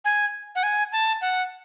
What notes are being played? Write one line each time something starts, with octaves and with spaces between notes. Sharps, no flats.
G#5
F#5
G#5
A5
F#5